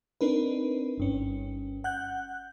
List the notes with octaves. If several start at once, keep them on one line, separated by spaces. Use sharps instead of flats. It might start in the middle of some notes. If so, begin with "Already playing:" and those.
C4 D4 D#4 A#4 B4
G1 G2 C#4
F#5 F#6 G6